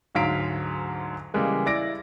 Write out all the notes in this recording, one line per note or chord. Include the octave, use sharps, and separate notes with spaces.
D2 G#2 F#3 F5 B6 D7
C#3 E3 G3 G#3 A#3
E4 D5 A#6 D7